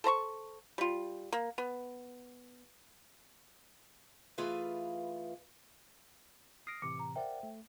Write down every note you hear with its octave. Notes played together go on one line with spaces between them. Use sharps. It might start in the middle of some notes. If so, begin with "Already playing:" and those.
A4 C5 A#5 C#6
G3 F4
A#3
B3
E3 A3 F4 G#4 B4 F5
D#6 F6 A#6 C7 D7
A2 C3 E3 D6 C#7
A#5
A#4 C5 D5 E5 F#5 G5
A3